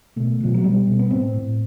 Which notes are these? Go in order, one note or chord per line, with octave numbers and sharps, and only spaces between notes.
B2 A3
B2 F3
F#3
B2 G3
B2
B3
A2 C4
A2